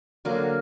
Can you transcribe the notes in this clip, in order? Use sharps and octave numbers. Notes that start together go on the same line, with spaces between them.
D3 F#3 A#3 A#4